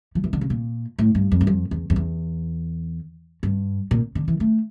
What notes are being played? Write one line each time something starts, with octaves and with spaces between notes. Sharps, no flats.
F3
E3
D3
C#3
A#2
A2
G2
F2
G2
F2
E2
F2
E2
G2
A#2
D3
E3
A3